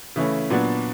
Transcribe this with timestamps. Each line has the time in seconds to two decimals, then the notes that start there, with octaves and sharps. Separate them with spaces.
0.16 C#3 E3 A3 C#4 E4
0.50 A#2 F#3 B3 D4 F#4